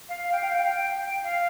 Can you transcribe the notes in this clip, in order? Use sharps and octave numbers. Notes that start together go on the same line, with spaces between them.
F5
G5
F5
G5
G5
F5